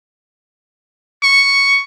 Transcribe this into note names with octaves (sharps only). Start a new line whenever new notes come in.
C#6